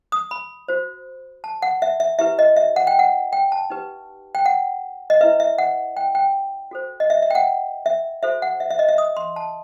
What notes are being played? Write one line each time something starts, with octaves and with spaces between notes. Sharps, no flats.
D#6
B5
F#4 C5
A5
F#5
E5
E5
E4 G4 B4 E5
D#5
E5
F#5
G5
F#5
G5
A5
D#4 G4 B4
G5
F#5
D#5
E4 B4 E5
E5
F#5
G5
G5
F#4 A4 C5
D#5
E5
E5
G5
F#5
E5
F#4 A4 C5 E5
F#5
E5
E5
D#5
E5
D#6
C6
A5